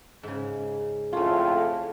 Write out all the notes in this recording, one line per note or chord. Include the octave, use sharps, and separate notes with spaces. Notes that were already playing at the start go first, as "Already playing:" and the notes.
G#2 C#3
F2 A2 A3 C#4 F4